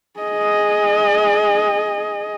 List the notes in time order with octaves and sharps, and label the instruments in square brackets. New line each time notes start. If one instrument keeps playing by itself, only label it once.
[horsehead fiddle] G#4 D#5